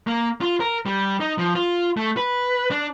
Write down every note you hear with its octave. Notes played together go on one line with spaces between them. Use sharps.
A#3
F4
A#4
G3
D#4
F3
F4
A3
B4
D4